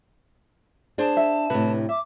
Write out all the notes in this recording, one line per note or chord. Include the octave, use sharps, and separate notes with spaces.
D4 G#4 C5 A5
E5
A2 C3 B4
E5 D6